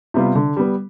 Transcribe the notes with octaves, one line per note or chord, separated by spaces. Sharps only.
C3 G3 B3 F4
D3
G3 B3